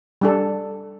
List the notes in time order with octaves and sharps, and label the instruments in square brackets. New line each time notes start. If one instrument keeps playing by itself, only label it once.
[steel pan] G3 D4 A4